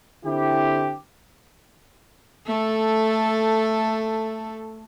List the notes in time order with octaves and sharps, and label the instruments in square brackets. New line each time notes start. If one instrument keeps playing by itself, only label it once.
[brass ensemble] D3 C4 E4 G4
[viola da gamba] A3 A4